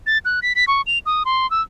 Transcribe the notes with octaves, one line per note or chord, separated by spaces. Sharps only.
A6
F#6
B6
B6
C#6
F7
D#6
C6
E6